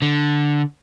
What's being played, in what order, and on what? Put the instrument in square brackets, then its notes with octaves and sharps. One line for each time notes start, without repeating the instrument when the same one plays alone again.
[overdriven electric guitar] D3